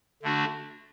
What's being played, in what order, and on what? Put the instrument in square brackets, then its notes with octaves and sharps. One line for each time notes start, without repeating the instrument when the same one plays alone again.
[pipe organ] D3 A3 D4 F#4